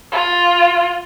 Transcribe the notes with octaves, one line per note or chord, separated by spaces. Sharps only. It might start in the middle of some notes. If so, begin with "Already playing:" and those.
F4